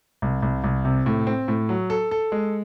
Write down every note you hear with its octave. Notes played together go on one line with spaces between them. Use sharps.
C2
C2
C2
C3
A2
C4
A2
F#3
A4
A4
G#3